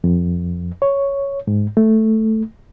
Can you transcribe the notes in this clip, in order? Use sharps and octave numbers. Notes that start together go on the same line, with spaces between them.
F2
C#5
G#2
A3